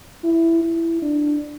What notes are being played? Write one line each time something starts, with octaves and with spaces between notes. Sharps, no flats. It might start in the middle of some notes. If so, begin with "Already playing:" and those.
E4
E4
D4